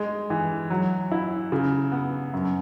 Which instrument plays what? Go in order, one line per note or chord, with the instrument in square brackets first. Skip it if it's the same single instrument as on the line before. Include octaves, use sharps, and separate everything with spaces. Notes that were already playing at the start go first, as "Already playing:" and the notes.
Already playing: [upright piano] G#3
E3
F#3
E4
C#3
B3
F#2